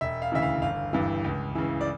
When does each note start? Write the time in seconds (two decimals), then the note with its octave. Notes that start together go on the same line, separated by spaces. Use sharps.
0.01 E1 E5
0.22 F5
0.32 D2 C#3 E3 E5
0.42 F5
0.62 G1 F5
0.93 G2 E3
1.24 C#2
1.55 C#3 E3
1.81 D5